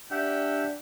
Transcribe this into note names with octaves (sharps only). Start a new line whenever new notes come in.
D4 G4 E5 F#5 G5